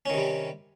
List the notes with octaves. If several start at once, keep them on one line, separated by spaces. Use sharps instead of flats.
C3 D#3 G3 C#4